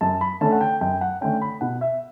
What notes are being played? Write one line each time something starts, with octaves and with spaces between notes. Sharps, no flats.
F#2 A5
B5
D3 A3 C#4 A5
F#5
G5
F#2 G5
F#5
D3 A3 C#4 G5
B5
B2 F#5
E5